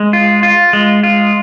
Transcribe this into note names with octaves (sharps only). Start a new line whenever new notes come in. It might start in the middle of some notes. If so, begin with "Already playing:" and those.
Already playing: G#3
F4
F4
G#3
F4